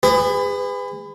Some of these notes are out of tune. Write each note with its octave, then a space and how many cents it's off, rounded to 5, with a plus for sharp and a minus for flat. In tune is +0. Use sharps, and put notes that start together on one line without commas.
G#4 -35 B4 +25